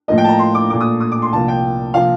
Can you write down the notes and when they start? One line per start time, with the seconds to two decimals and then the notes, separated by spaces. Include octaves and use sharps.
0.08 A2 F3 A#3 D#5
0.18 G5
0.24 A5
0.29 A#5
0.39 C6
0.55 D6
0.70 A#2 A3 D6
0.80 D#6
1.00 D#6
1.12 D6
1.22 C6
1.33 C2 C3 F3 A#3 A5
1.48 G5
1.94 C3 F3 A#3 F5